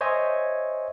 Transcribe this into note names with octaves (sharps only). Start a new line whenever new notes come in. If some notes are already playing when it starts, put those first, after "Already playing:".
C5 C#5 D#5 E5 G#5